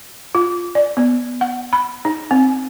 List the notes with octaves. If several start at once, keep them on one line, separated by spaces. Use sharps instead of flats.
F4
D5
B3
F#5
B5
D#4
C4